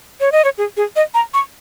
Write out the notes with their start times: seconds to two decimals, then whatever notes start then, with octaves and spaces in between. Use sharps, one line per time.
0.20 C#5
0.32 D#5
0.44 C#5
0.58 G#4
0.77 G#4
0.96 D#5
1.14 A#5
1.34 C#6